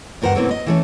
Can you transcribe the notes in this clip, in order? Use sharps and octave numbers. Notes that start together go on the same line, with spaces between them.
D2 G2 A#4 C5 F#5
B2 F#3 A3 A#3 C4 E4
D#5
E3 A3 C#4